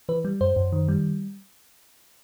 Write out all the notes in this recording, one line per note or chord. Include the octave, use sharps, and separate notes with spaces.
E3 B4
G3
F#2 C5
F#2
D#3
G3